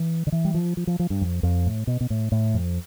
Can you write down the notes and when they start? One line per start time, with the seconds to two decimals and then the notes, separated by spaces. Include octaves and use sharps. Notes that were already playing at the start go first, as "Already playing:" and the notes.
Already playing: E3
0.27 D3
0.32 E3
0.45 G3
0.54 F3
0.77 F3
0.87 F3
0.99 F3
1.10 G2
1.21 F2
1.43 F2
1.66 A2
1.87 B2
2.01 B2
2.10 A2
2.32 A2
2.54 F2